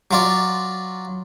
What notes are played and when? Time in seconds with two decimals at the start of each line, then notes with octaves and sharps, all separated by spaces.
0.11 F#3 F4 D5